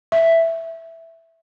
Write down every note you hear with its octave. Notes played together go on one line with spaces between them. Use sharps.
E5